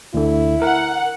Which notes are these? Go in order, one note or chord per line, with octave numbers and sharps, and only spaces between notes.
D2 D3 E4
A#4 F#5